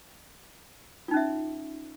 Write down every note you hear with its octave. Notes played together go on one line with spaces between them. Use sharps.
C#4 D#4 F4 E5